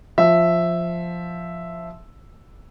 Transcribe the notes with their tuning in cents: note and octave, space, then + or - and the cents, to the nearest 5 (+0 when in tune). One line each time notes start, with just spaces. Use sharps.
F3 +0 E5 +0